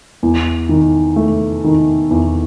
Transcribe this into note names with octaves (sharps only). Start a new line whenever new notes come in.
E2
D#3
A3
D#3
E2